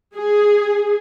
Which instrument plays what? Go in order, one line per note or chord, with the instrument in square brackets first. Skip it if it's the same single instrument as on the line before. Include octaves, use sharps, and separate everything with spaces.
[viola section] G#4